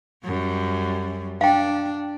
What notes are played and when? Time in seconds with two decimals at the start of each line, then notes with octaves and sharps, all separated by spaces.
0.24 F#2 G3
1.41 D4 F5 G5